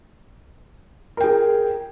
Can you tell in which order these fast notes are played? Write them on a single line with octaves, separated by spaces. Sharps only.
A#4 G5 G#4